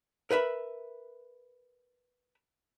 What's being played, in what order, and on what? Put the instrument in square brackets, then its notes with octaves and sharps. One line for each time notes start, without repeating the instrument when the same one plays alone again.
[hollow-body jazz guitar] A#4 B4 E5 B5